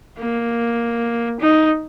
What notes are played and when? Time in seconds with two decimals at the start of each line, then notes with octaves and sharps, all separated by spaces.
0.19 A#3
1.40 D#4